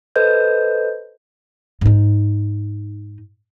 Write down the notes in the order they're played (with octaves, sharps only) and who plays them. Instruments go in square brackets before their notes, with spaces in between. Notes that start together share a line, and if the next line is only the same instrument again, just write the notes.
[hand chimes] A4 B4 C5 D#5 G6
[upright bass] G#2 D#4